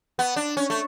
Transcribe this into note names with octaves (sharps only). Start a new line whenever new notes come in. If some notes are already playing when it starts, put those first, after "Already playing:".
B3
D4
C#4
A3